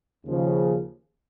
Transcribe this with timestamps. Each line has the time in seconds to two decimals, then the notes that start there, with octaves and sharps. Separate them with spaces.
0.24 D#2 C#3 F3